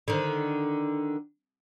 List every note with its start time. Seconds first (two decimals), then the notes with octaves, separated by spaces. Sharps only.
0.08 D3 D#3